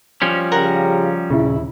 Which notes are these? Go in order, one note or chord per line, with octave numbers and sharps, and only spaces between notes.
F3 G3 C#4
F2 C#3 G4 A#4 F#5 A#5
D#1 C#3 E4